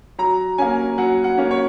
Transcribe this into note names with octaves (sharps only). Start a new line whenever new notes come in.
F#3 A#5
A#3 C#4 G#5
F#3 F#5
F#5
A#3 C#4
C#5